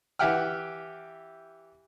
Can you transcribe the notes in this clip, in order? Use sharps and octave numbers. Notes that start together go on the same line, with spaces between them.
E3 G4 E5 F#5 G5 F6